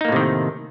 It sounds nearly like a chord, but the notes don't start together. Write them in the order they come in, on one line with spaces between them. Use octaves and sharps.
D#4 A#3 A2 C3 D#3